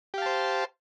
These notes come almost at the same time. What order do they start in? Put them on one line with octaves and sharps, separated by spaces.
G4 F5 A5 C5